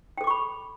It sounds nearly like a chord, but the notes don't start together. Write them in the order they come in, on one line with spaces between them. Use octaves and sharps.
G5 A4 D6 C#6 B5